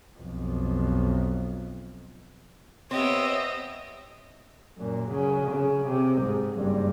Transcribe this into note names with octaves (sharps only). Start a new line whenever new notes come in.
B1 F2
B3 C4 G4 C#5 D#5 E5
F#2 A#2
C#3 F#3
C#3
C3
G#2
F#1 G2